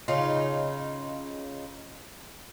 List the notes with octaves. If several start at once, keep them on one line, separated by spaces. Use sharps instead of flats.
C#3 D#4 F4